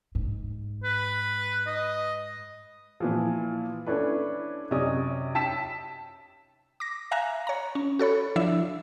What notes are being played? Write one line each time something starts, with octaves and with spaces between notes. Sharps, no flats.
G#2
B4
D#5
A#2 E3 F3
C#4 D4 E4 A4 B4
F#2 C3 C#4 D5 D#5 D#6
G5 A5 E6 B6 E7
D6 A#6
E5 F5 G#5 A#5 F#6 A#6
C#5 A#5
C#4
F#4 A4 C#5 B5
F3 D4 E4 D5 E5